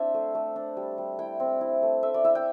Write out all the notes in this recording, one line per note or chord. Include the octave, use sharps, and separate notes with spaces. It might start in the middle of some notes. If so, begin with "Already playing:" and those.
Already playing: C4 D4 E4 C5 E5
A3
A3
D4
G3
G3
E4 G5
C4
E4
A3
A3 E5
D5
E4 E5
G5